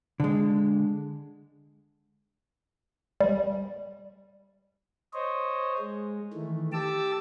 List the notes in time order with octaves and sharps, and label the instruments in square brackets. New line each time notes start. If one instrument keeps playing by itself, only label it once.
[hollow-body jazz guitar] D3 G#3
[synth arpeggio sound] G3
[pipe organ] C5 C#5 D#5
G#3
D#3 E3 A3
G4 A5 D6 E6